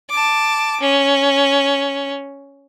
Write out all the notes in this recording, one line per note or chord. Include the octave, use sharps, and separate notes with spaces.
A5 D6
C#4